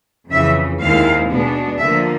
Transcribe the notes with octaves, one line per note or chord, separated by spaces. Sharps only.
F2 C#3 E3 E5
D#2 D#3 G#3 C4 E4 F5
B2 G#3 B3 D4
D3 F3 A#3 E5